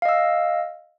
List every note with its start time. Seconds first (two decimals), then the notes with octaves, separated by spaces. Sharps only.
0.02 F5
0.05 D#5
0.09 E6